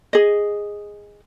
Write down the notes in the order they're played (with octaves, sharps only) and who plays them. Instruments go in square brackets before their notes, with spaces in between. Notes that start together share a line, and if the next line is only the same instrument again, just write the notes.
[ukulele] G#4 D#5